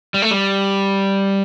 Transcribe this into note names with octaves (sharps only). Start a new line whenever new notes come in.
G3
A3
G3